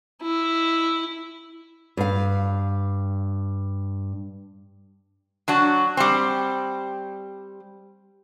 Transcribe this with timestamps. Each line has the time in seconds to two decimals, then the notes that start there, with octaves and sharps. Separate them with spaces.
0.23 E4
1.97 G2 F5
5.48 F#3 D4 F#4
5.97 G3 C4